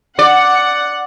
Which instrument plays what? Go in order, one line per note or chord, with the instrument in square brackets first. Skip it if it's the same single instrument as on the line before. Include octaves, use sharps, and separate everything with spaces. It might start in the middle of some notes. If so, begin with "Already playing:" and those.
[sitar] D5 [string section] F#5